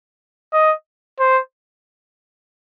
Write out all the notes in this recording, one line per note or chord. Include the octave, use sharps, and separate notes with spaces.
D#5
C5